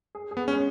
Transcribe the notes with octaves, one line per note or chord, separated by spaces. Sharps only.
G#4
G#4
B3
G#3 C#4